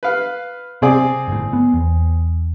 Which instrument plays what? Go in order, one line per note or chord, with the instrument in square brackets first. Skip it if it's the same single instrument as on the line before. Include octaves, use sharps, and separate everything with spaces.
[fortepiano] B4 F5
[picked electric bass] C3 [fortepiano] C4 G#4 D5
[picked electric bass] G1 A2
B3
E2